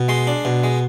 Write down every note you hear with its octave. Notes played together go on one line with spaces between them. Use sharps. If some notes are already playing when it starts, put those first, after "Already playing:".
Already playing: B2
G#3 C6
D4
B2
G#3